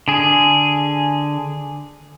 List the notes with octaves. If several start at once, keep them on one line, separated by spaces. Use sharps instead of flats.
D3 G#4